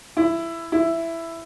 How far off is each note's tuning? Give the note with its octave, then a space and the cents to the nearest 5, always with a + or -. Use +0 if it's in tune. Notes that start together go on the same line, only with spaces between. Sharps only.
E4 +15
E4 +10